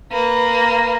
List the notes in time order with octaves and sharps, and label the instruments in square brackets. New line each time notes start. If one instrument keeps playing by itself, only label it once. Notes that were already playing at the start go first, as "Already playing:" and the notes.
[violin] A#3 B4